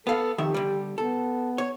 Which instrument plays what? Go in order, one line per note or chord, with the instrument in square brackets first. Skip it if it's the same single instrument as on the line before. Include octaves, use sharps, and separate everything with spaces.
[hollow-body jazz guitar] B3 F5 [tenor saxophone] A4
[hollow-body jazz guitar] F2 D#3 E5 [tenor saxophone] G4
[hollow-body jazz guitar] D3 G3
[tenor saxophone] B3 [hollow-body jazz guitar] A4
[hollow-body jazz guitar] C#5